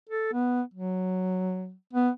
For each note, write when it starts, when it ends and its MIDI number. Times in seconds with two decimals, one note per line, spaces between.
0.09 0.28 69
0.33 0.62 59
0.74 1.74 54
1.93 2.09 59